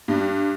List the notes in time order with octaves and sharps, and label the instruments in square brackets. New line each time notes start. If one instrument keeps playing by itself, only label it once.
[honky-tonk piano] G2